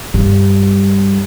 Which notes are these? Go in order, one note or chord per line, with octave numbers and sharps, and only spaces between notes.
G2 G3